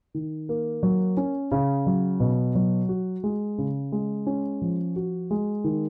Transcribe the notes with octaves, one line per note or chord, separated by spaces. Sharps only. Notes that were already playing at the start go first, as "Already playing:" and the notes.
D#3
A#3
F#3
C#4
C#3
F#3
B2
F#3
F#4
G#3
C#3
G#3
C#4
F3
F#4
G#3
D#3